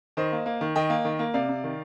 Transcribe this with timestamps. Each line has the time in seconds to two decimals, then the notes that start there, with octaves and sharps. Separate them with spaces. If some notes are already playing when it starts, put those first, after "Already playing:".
0.17 D#3 C5 D#5
0.32 A#3
0.46 A#3
0.61 D#3
0.75 D#3 D#5 G5
0.90 A#3
1.05 D#3
1.19 A#3
1.34 C3 D5 F5
1.49 C3
1.64 D#3